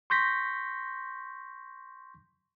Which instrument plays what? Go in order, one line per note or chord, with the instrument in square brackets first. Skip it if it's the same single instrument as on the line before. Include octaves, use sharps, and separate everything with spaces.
[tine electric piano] C6 C#6 G6 A#6 B6